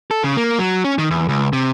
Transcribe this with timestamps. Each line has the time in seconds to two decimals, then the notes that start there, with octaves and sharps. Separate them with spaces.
0.11 A4
0.24 C#3
0.37 A#3
0.59 F#3
0.84 C#4
0.98 D#3
1.11 E2
1.29 C#2
1.53 C3